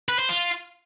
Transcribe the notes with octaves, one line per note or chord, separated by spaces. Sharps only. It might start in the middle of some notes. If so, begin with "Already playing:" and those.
B4
C5
F4